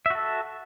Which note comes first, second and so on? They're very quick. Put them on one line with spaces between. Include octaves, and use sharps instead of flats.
E5 F#4 A4